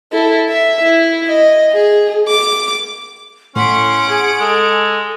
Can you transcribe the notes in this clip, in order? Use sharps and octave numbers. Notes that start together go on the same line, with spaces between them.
E4 A4
E5
E4
D#5
G#4
D6
A2 C#4 F#5 C6 B6 D7
G#4 G#5
G#3 A4